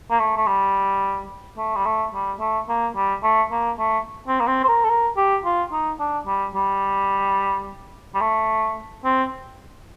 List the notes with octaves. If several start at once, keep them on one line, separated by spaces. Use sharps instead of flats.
A#3
A3
A3
G3
A3
G3
A3
G3
A3
A#3
G3
A3
A#3
A3
C4
A#3
C4
C5
A#4
A4
A#4
G4
F4
D#4
D4
G3
G3
G3
A3
C4